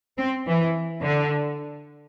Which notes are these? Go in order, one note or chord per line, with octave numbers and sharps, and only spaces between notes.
C4
E3
D3